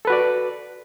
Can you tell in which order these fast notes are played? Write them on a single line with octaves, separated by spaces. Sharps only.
A4 B4 F#4 D5